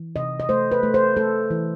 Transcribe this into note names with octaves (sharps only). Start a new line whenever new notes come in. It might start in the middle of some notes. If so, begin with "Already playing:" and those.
Already playing: E3
C3 D#5
D#5
A3 C5
B4
A3
C5
A3 A4
E3